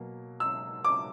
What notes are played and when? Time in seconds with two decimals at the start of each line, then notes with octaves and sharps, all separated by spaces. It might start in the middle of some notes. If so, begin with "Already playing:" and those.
Already playing: B2 F#3 A#3
0.40 E6
0.85 D6